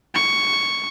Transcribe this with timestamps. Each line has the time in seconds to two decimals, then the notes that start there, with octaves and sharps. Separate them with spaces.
0.15 C#6